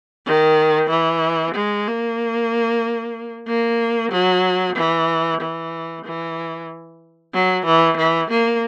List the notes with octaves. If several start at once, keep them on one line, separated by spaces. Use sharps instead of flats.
D#3
E3
G#3
A#3
A#3
F#3
E3
E3
E3
F#3
E3
E3
A#3